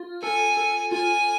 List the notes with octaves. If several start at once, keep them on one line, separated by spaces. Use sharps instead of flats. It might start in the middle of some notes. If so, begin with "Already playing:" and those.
Already playing: F4
A4 G#5
A4
F4 G#5